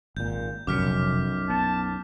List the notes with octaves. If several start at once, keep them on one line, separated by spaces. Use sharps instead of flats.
G#1 A#2 G6
F1 B1 F#2 A#2 D6 F6 B6
B3 A5